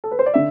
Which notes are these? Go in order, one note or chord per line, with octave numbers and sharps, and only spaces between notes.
A4
B4
C5
D5
D3 E5